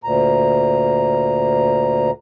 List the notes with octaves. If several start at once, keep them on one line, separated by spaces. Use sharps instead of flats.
D2 A#2 A#5